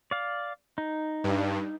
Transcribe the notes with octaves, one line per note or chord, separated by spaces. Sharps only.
D5 F5
D#4
G2